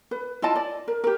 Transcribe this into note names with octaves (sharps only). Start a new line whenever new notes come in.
B4
E4 F4 D#5 A5
D5
A#4
G4 A#4